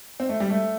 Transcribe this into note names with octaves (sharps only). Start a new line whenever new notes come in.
C4
A3
G3
A3